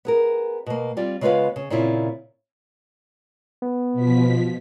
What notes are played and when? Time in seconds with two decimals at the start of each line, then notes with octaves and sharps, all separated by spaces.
0.05 B3 G#4 A#4
0.66 B2 A#3
0.97 G3 C4 F4 D5
1.21 C#3 G#3 B3 F4 B4 F5
1.56 C#3
1.70 A#2 C#3 C4 E4 F4
3.62 B3
3.93 B2 F3 B6